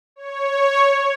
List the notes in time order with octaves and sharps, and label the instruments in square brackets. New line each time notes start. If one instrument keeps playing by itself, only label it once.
[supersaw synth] C#5